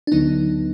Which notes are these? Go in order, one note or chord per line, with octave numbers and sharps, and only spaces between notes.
D4
D2 D3 F#3 B3 D#4